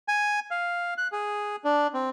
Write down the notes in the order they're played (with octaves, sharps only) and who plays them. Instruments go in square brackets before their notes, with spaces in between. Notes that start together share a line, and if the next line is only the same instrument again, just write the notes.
[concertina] G#5
F5
F#6
G#4
D4
C4